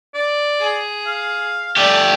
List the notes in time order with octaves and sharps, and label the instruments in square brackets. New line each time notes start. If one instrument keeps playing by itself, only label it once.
[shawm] D5
[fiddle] G#4
[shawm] F5
[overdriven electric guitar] A3 G4 [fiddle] D5 A5